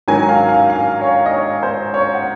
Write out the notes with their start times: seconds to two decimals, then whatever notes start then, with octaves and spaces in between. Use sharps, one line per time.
0.08 G#2 D#3 F#3 G#5
0.29 F5
0.49 F5
0.70 F5
1.01 C#5
1.26 D#5
1.33 C#5
1.63 C5
1.94 C#5
2.14 F#5